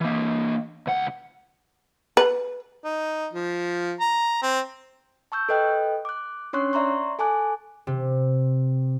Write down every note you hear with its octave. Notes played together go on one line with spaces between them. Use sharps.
E3 A#3
C#2 F#5
B4
D#4
F3
A#5
C4
A5 C#6 E6 G6
A4 B4 D#5 G5 F#6
D6 F#6
C#4 D4 C#5 C6 C#6 F#6
D5 E5 A#5 C6 C#6
A4 G#5 A5 D6 F#6
C3